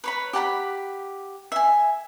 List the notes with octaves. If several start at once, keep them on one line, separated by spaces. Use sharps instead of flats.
B4 C#5 B5
G4 F#5 A5 B5
E5 G#5